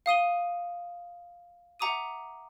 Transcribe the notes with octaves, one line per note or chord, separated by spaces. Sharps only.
F5 D#6 D#7 G7
E5 F#5 A#5 D6 D#6 D#7